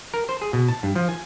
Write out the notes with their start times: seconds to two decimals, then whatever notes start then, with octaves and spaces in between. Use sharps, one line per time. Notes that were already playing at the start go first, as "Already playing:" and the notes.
0.14 A#4
0.29 C5
0.42 G#4
0.53 B2
0.68 A5
0.83 G2
0.96 F3
1.09 G#5